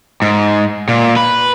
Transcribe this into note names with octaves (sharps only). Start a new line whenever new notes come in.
G#2
A#2
B4